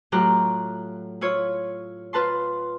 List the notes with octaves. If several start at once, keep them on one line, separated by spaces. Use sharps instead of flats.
A2 F#3 F4 G4 A#5 F#6
E4 F4 C#5
F4 B4 A5 C6